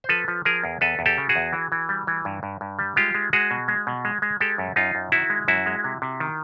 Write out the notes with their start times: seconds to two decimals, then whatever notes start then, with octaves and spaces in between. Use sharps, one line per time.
0.04 C5
0.09 F3 A4 B4
0.28 F3
0.45 F3 G#4 A#4
0.64 E2
0.81 E2 A4 B4
0.99 E2
1.06 G4 A4
1.18 C#3
1.29 F#4 G#4
1.36 E2
1.53 E3
1.72 E3
1.89 G3
2.07 E3
2.25 G2
2.43 G2
2.61 G2
2.79 G3
2.96 G#3 F4 G4
3.14 G#3
3.33 G#3 F#4 G#4
3.51 B2
3.68 G#3
3.87 B2
4.05 G#3
4.22 G#3
4.40 G#3 G4 A4
4.58 F#2
4.76 F#2 D#4 F4
4.95 F#2
5.12 D#3 E4 F#4
5.30 G#3
5.48 F#2 E4 F#4
5.66 G#3
5.84 C3
6.02 C3
6.20 D#3